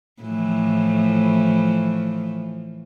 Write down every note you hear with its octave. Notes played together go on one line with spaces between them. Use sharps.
A2 E3 F3